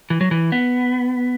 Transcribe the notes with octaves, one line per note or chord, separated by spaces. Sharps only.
E3
F#3
E3
B3